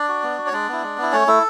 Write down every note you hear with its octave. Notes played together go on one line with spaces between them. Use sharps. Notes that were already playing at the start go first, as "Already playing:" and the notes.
Already playing: D4 D5
F#4
B3
F#4
C#5
G#3 D4 D5
B3 E4
G#3
B3 E4
A3 C#4 C#5
A3 E4 A4